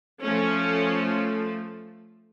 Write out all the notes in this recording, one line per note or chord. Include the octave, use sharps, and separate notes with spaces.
F3 A3 C#4